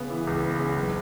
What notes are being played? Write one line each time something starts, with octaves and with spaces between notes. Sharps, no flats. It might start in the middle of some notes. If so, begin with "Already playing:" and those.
Already playing: C#3 B3
E3
C#2
B3
C#3
F#1